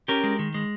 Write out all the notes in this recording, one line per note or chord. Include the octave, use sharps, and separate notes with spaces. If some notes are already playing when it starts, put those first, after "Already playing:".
C#4 G4 A#4
G#3
D#3
G#3